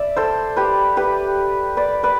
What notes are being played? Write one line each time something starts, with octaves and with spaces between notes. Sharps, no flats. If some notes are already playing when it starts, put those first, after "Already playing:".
Already playing: D5 E5
A4 C5
G4 B4
G4 B4
B4 D5
B4 D5